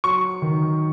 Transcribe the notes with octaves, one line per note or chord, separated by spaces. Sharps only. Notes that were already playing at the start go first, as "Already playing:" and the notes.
F#3 C#6
D#3